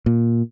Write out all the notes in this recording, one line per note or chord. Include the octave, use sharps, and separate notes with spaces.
A#2